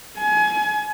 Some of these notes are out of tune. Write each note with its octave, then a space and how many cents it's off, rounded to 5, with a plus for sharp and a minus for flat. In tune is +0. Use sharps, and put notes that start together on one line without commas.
G#5 +30